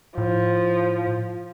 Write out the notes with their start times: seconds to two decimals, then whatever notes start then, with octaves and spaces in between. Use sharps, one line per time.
0.18 A2 F3